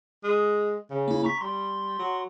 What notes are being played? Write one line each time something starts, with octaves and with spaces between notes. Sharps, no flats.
G#3
C#3
A#3 E4
A#5 C#6 B6
G3 C6
F#3